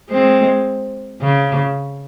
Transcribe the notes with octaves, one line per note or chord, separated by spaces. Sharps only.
G#3 C4
C#3